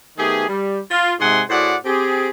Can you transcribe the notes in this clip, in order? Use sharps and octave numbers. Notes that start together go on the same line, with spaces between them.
D#3 A3 B3 G4 G#4
G3
F4
G#2 C3 G#3 F#5 G#5 C6
A2 F#4 G#4 C5 D5 F#5
C4 G4 G#4